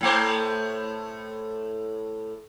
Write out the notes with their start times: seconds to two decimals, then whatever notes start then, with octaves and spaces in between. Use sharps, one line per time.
0.01 A2 A3 C5